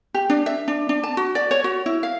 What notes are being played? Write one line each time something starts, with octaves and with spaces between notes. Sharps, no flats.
G4
D4
E5
D4
D4
A5
F#4
D5
C#5
F#4
E4
F5